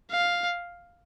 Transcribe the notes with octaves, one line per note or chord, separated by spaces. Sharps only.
F5